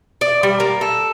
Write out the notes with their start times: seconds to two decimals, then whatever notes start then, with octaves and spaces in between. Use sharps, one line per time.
0.21 D5
0.43 G3
0.60 A#3
0.81 A4